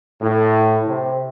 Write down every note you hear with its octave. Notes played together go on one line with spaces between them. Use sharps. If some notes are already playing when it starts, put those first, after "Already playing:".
A2
C3